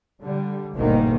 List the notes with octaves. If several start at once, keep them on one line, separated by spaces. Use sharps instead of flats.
D3 G3
G1 D2 G#2 B2 D#3 A#3